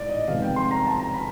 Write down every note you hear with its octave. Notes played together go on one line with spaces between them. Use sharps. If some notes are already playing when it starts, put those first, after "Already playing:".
Already playing: A1 G#2 D5
D#5
F2 C3 D#3 G#3 B3 F5
G5
C6
A#5
A5
A#5
B5